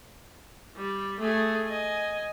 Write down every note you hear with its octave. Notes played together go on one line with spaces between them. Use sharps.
G3
A3 G#4
D#5 G#5